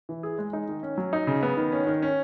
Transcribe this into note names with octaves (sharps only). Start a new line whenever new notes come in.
E3
G#4
G#3
D#4
D#3
C#4
F#3
D#4
C#3
B3
D#3
C#4
D#3
C#4